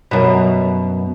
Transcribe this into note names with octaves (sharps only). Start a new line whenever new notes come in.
F#2 B2